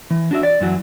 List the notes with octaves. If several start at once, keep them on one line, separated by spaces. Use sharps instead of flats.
E3
D4 F#4 E5
D5
F#2 E3 F#3